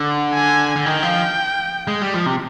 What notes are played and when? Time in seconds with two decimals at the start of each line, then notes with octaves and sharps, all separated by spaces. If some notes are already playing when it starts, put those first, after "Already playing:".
Already playing: D3
0.34 G#5
0.76 D3
0.86 D#3 G5
1.03 F3
1.88 G#3
2.02 G3
2.14 F3
2.26 C3